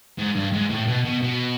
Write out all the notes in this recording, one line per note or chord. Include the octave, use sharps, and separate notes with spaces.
G#2
G2
G#2
A2
B2
B2
B2